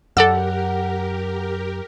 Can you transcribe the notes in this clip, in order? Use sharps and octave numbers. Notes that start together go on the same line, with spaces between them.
F#2 G4 A4 A#4 D5 F#5 E6